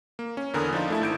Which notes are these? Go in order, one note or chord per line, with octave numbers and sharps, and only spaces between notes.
A#3
C#4
E2 D3 A#4 G#5 B5 D#6
F3 D4 D#4 F4
A3 E4 A5
G#1 G6 D7